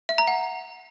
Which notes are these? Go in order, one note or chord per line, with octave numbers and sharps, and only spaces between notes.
E5
A#5
F#5